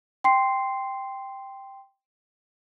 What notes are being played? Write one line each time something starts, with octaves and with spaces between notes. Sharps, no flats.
G5 C6 C7